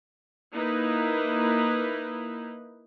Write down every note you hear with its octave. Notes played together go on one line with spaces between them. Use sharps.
A#3 D#4 E4 B4